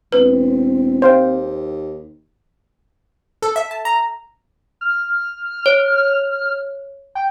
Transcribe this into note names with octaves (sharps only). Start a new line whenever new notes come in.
E1 C4 B4
D#2 C5 F5 G5
A4
E5
A5
A#5
F6
C#5
G5